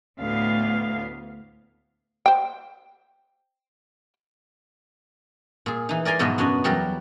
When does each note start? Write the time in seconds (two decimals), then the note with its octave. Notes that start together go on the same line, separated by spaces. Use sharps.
0.20 D2 A2 B3 F5
2.26 C5 G5
5.66 A#2 G#4
5.89 E3 D#4
6.05 A#4 D5 G#5 A#5 C6
6.19 G#2 B2 F3 F#3 B3 D#5
6.38 F#2 D4 F#4 C#5 D#5
6.64 E2 F#3 G3 G4 A#4